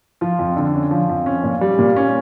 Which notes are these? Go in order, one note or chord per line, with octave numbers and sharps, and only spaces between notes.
F3 F4
F2
D3
C#4
F3
F2
C#4
A#2
G3
A#2
C#4